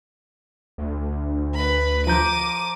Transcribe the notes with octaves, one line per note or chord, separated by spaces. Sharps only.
D2
B4 B5
F3 A#5 D6 G6 D#7